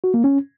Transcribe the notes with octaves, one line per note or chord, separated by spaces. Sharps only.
F#4
A#3
C#4